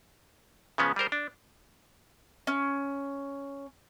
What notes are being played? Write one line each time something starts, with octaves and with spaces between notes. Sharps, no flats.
C#3 F3 G#3 B3 C#4
G3 G#4 A#4 C5
D4
C#4